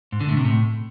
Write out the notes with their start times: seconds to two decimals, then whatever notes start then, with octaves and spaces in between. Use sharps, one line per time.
0.12 G#2
0.21 D3
0.29 A2
0.37 C3
0.45 A2